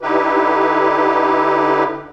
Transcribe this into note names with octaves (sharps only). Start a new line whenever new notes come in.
D3 D#4 E4 G4 B4